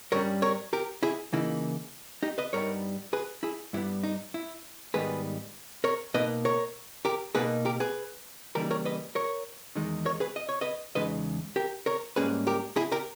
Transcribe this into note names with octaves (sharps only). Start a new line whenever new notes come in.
G2 G3 C#4 A#4 C#5
A#4 C#5
G4 A#4
E4 G#4
C#3 E3 A#3 D#4 E4
D#4 G4
B4 D#5
G2 G3 B3 D#4 A#4 C#5
G#4 B4
E4 G#4
G2 G3 B3 E4
D#4
E4
G#2 D#3 G3 B3 G#4 B4
A#4 C#5
B2 A#3 D#4 B4 D#5
A#4 C#5
G4 A#4
B2 A#3 D#4 G#4 B4
G4 A#4
G#4 B4
C#3 E3 G3 A#3 D#4 G4 A#4
A#4 C#5
B4 D#5
A#4 C#5
E2 D#3 G#3 D#4
A#4 C#5
G#4 B4
D#5
C#5
B4 D#5
E2 C#3 G#3 D#4 B4 D#5
G4 A#4
A#4 C#5
G#2 G3 A#3 C#4 G#4 B4
G4 A#4
E4 G#4
G4 A#4